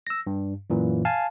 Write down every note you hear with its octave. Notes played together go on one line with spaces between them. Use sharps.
E6 A#6
G2
F#2 A#2 E3
F5 G#5 A5